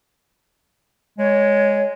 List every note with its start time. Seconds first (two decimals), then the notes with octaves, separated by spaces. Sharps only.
1.19 G#3 C#5